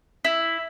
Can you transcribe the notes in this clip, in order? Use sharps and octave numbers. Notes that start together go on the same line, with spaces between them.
E4